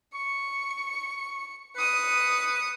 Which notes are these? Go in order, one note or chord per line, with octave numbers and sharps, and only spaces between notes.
C#6 C#7
B4 D#6 C#7